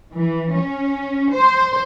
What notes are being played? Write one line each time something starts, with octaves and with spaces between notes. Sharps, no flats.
E3
C#4
C5